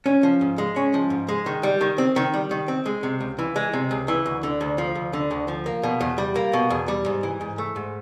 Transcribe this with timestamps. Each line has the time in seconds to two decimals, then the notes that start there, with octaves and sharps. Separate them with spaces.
0.06 C#4
0.23 F3
0.41 G#2
0.58 G#3
0.76 C#4
0.94 F3
1.10 G#2
1.28 G#3
1.46 D#3
1.63 G3
1.81 D#3
1.98 C4
2.16 D#3
2.34 G3
2.51 D#3
2.68 C4
2.86 G#3
3.03 C3
3.21 C#2
3.39 E3
3.56 G#3
3.73 C3
3.91 C#2
4.08 E3
4.26 D2
4.43 D3
4.61 D2
4.78 F3
4.95 D2
5.13 D3
5.31 D2
5.48 F3
5.66 A#3
5.83 B2
6.01 E2
6.18 G3
6.36 A#3
6.53 B2
6.70 E2
6.88 G3
7.06 G#2
7.23 E3
7.41 G#2
7.58 A3
7.76 G#2